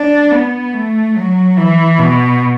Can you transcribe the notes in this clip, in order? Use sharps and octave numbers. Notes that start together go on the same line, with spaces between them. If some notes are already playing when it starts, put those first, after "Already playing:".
Already playing: D4
B3
A3
F#3
E3
B2